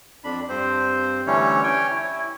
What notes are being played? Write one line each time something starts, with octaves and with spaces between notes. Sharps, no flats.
F2 D4 B5
G2 C4 C5
D3 E3 G3 A3 C#4 C#5
C#5 G5 G#5
E4